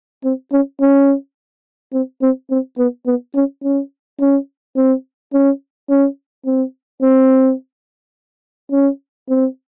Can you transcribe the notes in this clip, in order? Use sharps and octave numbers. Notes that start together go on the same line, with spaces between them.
C4
C#4
C#4
C4
C4
C4
B3
B3
C#4
C#4
C#4
C4
C#4
C#4
C4
C4
C#4
C4